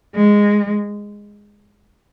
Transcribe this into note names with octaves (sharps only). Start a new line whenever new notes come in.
G#3